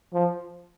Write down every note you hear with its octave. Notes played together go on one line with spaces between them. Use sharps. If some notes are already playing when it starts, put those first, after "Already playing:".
F3